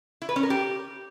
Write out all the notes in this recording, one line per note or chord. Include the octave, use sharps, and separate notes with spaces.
E4
B4
C#4
A#4
G4